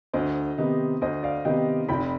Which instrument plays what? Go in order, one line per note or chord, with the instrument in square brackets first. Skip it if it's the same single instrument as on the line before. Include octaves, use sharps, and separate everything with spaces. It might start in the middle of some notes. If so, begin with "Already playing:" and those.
[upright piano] D2 [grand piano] C5 D#5
[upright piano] C3 D#3 B3 D#4
[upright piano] D2 [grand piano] C5 D#5
[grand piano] D5 F5
[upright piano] C3 D#3 B3 D#4 [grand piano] D#5 G5
[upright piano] F1 [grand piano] G5 B5